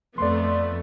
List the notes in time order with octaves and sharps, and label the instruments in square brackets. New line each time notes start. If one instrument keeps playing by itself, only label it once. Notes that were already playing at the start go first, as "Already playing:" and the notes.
[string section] F2 A3 B3 [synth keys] D5 C6